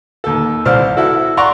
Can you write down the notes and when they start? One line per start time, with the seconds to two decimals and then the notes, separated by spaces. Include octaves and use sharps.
0.24 D#2 A4
0.65 C2 C5 D5 F6
0.97 E4 F#4 A4
1.37 D5 F#5 A#5 C6 C#6